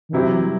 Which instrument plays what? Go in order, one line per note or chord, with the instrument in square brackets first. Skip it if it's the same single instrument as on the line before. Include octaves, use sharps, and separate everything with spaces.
[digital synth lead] D#3
[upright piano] C3 F#3 C4 E4 G4 [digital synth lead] E3
[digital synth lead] G3